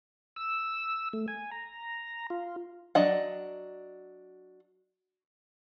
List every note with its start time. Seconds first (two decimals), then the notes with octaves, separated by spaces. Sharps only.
0.36 E6
1.13 A3
1.28 G#5
1.51 A#5
2.30 F4
2.95 F#3 D4 D#5 F#5